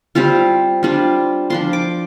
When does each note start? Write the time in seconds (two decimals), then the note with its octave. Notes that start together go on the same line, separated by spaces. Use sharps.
0.15 G3 C4 F4 F5
0.83 G3 D4 F4
1.50 F3 D4 F4 C6
1.73 D6